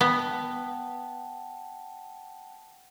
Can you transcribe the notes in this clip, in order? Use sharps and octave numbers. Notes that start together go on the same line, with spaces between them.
B3 F#5 G5 A5